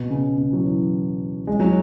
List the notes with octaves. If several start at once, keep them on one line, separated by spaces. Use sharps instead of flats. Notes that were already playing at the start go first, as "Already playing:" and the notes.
Already playing: B2
C#3
C#3
F#3
E3
G#3
F#3